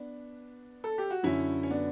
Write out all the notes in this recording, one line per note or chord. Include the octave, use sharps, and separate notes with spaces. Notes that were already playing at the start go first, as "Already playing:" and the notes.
Already playing: B3 D4
A4
G4
F#4
F#2 D3 C#4 E4
C#4
B3 D4